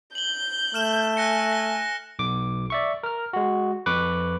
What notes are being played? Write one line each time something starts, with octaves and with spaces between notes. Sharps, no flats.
G6 F#7 G7
A3 F6 E7
G#5 F#6 A#6 C#7
A#6
B1 D6
D5 E5 C#6
A#4 F6
G#3 F#4
F2 B4 C#6 D6 F#6